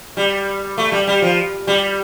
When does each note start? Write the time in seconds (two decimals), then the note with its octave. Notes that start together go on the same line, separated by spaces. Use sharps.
0.17 G3
0.78 A3
0.92 G3
1.07 G3
1.22 F3
1.67 G3